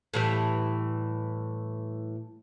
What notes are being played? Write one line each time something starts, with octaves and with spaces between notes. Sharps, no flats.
A2 E3 G3